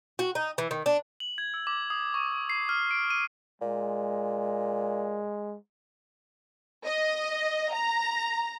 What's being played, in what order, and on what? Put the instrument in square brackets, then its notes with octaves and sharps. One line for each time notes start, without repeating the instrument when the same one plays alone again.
[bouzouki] F#4
D#4
E3
D#3
D4
[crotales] F#7
G#6
E6
D6
D#6
C#6
C7
F6
D7
D#7
[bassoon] A#2 [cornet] G#3
[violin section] D#5
A#5